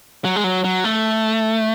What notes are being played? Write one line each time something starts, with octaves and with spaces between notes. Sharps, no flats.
F#3
G#3
F#3
F#3
A3